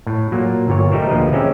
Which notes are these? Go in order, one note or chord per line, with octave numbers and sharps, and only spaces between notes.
A2
A#2 F#3 A#3
G1 A#2 C#5
G3 A3 D#4 G4 A#4 C5
D2 A#2 F3 B4 D#5
G#3 C4 C#4 G4 C5 E5